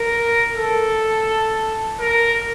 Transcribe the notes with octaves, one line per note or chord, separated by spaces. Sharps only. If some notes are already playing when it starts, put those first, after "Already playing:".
Already playing: A#4
A4
A#4